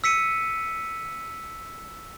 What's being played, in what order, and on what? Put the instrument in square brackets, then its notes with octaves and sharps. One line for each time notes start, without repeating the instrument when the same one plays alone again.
[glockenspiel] E6 B6 C#7 D#7